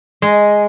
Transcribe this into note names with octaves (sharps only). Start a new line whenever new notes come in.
G#3